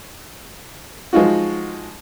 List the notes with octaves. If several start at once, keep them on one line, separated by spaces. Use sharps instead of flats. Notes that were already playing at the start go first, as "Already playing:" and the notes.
F3 G#3 D#4 F4 F#4